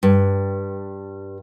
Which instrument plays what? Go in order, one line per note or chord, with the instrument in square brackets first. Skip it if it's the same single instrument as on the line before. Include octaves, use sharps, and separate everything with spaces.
[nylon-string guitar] G2